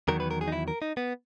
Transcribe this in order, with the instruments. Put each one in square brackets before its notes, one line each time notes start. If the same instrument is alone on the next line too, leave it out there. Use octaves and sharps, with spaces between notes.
[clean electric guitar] E2 D#3 F#3 A#4
B4
A#4
G#4
D#4
E4
A#4
D#4
B3